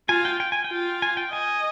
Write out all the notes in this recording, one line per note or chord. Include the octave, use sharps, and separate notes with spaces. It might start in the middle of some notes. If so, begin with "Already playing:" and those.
F4 G#5
G5
G5
G#5
G5
F4
G#5
G5
D#5 G#5